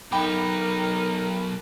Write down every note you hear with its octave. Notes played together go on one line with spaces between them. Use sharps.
B1 D#4 A#4 G5 B5 D6